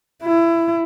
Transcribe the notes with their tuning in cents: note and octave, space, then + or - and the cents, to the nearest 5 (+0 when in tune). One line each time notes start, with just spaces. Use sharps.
E4 +20